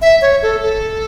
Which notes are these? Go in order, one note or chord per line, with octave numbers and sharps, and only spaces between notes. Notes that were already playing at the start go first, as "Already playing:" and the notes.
E5
C#5
A4
A4